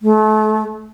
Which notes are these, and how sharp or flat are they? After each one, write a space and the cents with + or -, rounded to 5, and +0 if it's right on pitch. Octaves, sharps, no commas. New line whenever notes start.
A3 -35